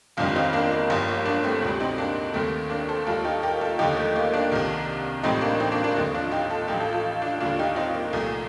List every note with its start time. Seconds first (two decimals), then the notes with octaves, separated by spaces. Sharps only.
0.17 G1 F2 D#3 G3 D4 F4
0.35 C4 D#4
0.53 A#3 D4
0.72 A#3
0.90 G1 G2 F3
1.08 A#3
1.25 A#3 D4
1.44 A3 C4
1.62 D2 C3 G3
1.80 C4 D#4
1.98 A#3 D4
2.34 D#2 D#3 G3 A3 C4
2.70 A#3 D4
2.89 A4 C5
3.06 D#2 D#3 G3 F4 A4
3.24 D#4 G4
3.43 G4 A#4
3.61 F4 A4
3.79 D#2 D3 F3 D#4 G4
3.97 A3
4.15 A#3
4.33 A#3 D4
4.52 C2 C3 D#3
5.23 A1 A2 G3 C4 D#4
5.41 A#3 D4
5.60 C4 D#4
5.72 A#3 D4
5.84 A#3 D4
5.96 D#2 D3 F3 C4 D#4
6.14 D4 F4
6.31 D#4 G4
6.50 F4 A4
6.68 A1 A2 F3 D#4 G4
6.80 F4 A4
6.93 F4 A4
7.22 D4 F4
7.40 D#2 D3 G3 D4 F4
7.59 D#4 G4
7.76 C4 D#4
7.94 A#3
8.13 C2 A#2 F3 A3